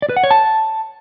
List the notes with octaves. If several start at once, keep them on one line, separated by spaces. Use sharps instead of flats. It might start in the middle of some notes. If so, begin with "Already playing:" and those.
D5
B4
F#5
C#5
A5